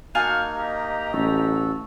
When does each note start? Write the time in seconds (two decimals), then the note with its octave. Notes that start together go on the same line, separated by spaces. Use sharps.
0.15 A#3 D#4 F#4 F5 G#5 A5 F6 G6
0.54 G4 D#5 A#5
1.13 A1 F#4 A4